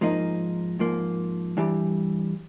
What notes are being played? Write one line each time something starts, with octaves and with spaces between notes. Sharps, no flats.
G#2 F3 A#3 D#4
G#2 F3 A#3
G2 E3 G3